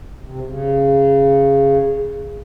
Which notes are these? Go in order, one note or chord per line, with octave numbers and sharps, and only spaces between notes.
C3
C#3